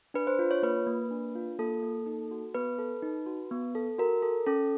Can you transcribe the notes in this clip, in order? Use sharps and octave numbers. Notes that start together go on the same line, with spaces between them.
D4 B4
C5
F4
C#5
A#3 B4
A#3
D4
F4
A#3 A4
A#3
D#4
F#4
B3 B4
A4
D#4
F#4
B3
A4
F#4 A#4
A4
C#4 A4